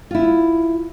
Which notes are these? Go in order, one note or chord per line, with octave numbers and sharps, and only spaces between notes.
E4 F4